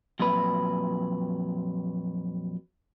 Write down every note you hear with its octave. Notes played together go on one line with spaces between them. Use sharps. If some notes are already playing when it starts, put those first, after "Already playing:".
F2 A#2 F#3 B4